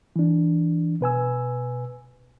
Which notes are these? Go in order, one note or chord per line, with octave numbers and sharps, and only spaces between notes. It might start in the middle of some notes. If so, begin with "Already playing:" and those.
E3 D4
B2 B4 G#5 E6